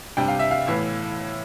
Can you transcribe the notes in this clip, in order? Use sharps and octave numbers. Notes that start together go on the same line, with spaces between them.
C3 G3 D4 G5
F5
E5
F5
A2 E3 B3 E4